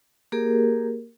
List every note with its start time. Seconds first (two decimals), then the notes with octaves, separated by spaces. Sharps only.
0.32 A#3 G4 G#4 A#4